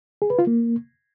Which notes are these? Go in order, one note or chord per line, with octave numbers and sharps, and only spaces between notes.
G#4
B4
F4
A#3